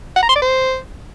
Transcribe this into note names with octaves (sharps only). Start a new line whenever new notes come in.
F#5
A#5
C6
D5
C5